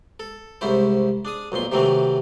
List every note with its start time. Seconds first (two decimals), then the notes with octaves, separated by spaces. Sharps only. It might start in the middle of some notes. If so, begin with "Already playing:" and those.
0.20 A4
0.61 C2 G#2 C#4 E4 C5
1.25 D4 G#4 D#6
1.52 B1 F2 A#2 C6
1.72 C3 D#3 E3 F#3 A3 C4